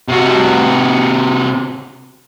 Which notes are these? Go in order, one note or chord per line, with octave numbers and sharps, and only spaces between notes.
C3 F#4